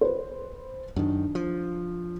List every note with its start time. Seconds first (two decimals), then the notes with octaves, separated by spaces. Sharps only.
0.01 B4 C5
0.96 F#2 D#3 D4
1.35 F3